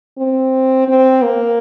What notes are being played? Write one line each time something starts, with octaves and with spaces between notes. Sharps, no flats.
C4
C4
A#3